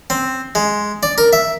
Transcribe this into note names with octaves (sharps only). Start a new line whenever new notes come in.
C4
G#3
D5
A#4
E5